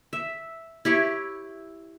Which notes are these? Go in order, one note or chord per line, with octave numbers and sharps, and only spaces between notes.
E5
E4 G4 C#5